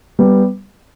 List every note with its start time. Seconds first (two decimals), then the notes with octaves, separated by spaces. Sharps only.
0.19 G3 B3